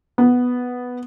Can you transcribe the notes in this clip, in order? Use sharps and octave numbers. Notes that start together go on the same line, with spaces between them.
B3